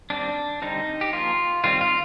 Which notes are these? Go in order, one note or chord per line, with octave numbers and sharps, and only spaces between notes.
D#3 G3 C4 D4
D3 G3 C4 D#4
G4
F3 A#3 F4
D#3 G3 C4 F4
F4